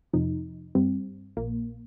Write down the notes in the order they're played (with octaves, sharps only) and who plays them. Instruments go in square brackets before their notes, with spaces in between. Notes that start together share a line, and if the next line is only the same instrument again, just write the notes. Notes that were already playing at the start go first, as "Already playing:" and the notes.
[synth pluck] F2 C3 F3 D#4
G2 G3 C4
A#1 A#2 A#3